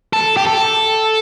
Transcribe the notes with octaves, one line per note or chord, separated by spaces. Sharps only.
A4
G4
A4